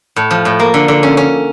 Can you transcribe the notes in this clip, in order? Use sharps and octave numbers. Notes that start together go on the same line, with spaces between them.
A2
F3
A2
A#3
D3
D3
C#4
C#4